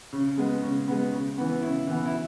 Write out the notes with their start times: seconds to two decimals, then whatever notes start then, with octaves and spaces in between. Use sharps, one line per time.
0.13 C#3
0.38 G#3 B3
0.63 C#3
0.88 G#3 B3
1.12 C#3
1.38 E3 B3
1.62 C#3 E4
1.88 E3 B3
2.05 E4